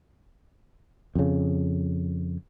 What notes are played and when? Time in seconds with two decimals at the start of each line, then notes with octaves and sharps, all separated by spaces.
1.15 F2 C#3